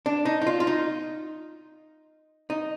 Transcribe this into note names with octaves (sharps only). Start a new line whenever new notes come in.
D4
D#4
D#4
F4
F4
D#4
D#4